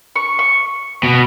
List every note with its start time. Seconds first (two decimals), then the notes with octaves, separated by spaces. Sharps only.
0.16 C#6
0.39 C#6
1.03 B2